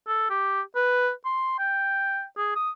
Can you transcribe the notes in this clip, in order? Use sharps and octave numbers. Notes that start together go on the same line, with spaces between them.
A4
G4
B4
C6
G5
G#4
D#6